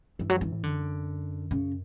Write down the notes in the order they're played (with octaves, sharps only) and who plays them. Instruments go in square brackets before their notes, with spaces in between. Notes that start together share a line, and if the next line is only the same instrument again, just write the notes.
[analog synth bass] G2 [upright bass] E3
[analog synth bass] F#2 [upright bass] F#3
[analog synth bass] G2 [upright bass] E3
[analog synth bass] A2
[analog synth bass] F#2 [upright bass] D3
[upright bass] C#3